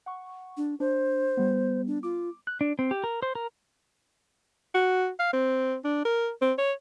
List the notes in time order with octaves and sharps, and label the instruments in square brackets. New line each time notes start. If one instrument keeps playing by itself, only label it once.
[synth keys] F#5 C#6
[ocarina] D4
[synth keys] D4 [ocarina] C5
[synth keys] G3 B3
[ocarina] D4
[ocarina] F4 [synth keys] D6
[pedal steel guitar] F#6
D4
C4
G4
A#4
C5
A#4
[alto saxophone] F#4
F5
C4
D4
A#4
C4
C#5